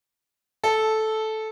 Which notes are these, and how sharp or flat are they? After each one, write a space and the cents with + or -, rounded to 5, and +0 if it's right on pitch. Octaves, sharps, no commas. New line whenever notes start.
A4 -10